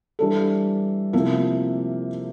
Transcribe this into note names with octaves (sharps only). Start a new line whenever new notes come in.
E3 G3 D4 A4
C3 F3 A#3 E4 A#4